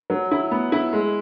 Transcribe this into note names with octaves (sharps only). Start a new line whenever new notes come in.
F#3
E4
B3
E4
G#3